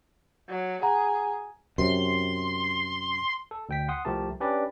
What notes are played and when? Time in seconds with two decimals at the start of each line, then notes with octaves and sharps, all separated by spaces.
0.49 F#3
0.82 G#4 F#5 A#5
1.78 F#2 C3 C6
3.51 A4
3.69 D2 G5 B6
3.88 F#5 C6 D#6
4.05 C2 F3 A3 G4 A#4 A5
4.40 C#4 D4 G4 B4 D5